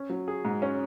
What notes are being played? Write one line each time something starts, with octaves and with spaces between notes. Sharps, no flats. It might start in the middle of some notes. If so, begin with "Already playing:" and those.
Already playing: C#4
F#3
G#4
G#2
C#4